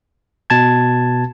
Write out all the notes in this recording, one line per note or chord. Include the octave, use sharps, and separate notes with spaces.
B2 A5 G#6